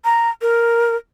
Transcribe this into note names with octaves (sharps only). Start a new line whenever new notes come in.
A#5
A#4